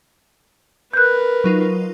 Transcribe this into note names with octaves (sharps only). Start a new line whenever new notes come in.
A#4 B4 F#6 G6
F#3 D#4 F4